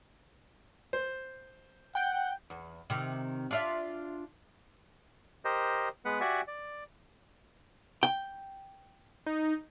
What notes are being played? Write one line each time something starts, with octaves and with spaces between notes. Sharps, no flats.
C5
F#5 G5 G6
E2
C3 D#3
D4 F4 E5
G4 A#4 C5 D#5
G#3 B3 B4 F#5
F#4 G4 D5 E5 F#5 G#5
D5
G5
D#4